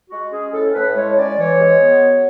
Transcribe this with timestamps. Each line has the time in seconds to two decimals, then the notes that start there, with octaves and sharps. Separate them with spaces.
0.10 G#3 F#4
0.31 C#4 G#4
0.52 A2 A4
0.73 A2 B4
0.95 G#3 C#5
1.17 C#4 D5
1.38 E3 C#5
1.59 G#3
1.81 B3
2.02 F#2